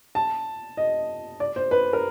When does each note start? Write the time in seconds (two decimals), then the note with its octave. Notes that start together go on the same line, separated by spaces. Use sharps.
0.15 A5
0.77 D#5
1.40 D5
1.56 C5
1.71 B4
1.93 A#4